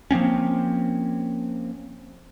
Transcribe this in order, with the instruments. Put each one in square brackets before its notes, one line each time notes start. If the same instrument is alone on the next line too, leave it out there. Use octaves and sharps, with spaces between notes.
[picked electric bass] F3 A#3 C4 C#4